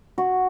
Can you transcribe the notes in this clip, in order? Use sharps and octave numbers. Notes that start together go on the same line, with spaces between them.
F#4